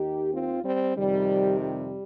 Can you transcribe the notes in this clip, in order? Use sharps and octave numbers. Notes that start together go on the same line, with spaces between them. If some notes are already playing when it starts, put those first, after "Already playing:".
Already playing: D#2 D#3 D#4 G4
C4 F4
G3 C4
F2 C3 D#3 G3
G3